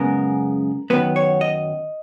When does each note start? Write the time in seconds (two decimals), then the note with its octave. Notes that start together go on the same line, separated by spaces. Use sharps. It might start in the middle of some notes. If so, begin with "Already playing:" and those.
Already playing: F#2 C#3 G#3 B3 A#4
0.90 F#2 D#3 F#3 B3 B4
1.16 C#5
1.41 D#5